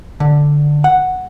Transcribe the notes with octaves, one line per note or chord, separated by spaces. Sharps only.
D3
F#5